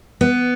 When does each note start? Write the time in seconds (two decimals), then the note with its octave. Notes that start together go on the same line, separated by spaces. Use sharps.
0.21 B3